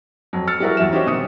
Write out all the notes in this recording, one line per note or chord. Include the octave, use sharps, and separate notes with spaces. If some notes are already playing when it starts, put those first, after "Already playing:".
F2 F#3
E6 F6 A6 C#7
G3 E4 F#4 G#4 A#4
E2 F#3 E5 E7
C#4 D#4 F#4 G4 C5 C#5
B2 D#3 C4 D#6 C#7